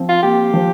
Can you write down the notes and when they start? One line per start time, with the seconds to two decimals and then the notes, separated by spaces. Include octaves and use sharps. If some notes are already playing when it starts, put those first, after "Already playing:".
Already playing: F3 C4
0.09 F4
0.23 A#3 G4
0.54 F3